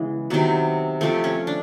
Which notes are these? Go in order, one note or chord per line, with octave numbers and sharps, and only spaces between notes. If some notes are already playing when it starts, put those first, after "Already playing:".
Already playing: C#3 E3 G#3 B3
C3 D#3 F#3 B3
C3 F3 A3 C4
C#4
D4